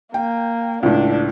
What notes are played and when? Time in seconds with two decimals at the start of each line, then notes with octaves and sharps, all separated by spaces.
0.14 A#3 G5
0.83 C#2 A2 D4